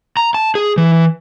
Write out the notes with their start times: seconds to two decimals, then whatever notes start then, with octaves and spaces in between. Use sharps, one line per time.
0.17 A#5
0.34 A5
0.55 G#4
0.78 E3